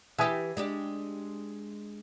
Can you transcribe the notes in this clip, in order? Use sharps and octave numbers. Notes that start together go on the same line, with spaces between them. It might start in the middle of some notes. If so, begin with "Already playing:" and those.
E3 G4 E5 G#5 D#6
G#3 D4 G4